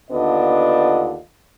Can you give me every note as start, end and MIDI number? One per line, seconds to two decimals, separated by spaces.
0.11 1.17 39
0.11 1.17 50
0.11 1.17 59
0.11 1.17 62
0.11 1.17 65
0.11 1.17 75